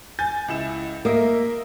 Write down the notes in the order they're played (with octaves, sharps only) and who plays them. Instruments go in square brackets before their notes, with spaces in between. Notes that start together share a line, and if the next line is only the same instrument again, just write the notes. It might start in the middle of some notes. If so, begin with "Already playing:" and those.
[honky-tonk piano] G#5 G6 A6
C#2 E4 E7
[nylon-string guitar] A#3 [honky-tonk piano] A#4 D#5 E5